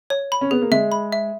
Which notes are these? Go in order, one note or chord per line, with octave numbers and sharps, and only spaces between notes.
C#5
B5
C#4
B3 G#4
A#3
G#3 E5
B5
E5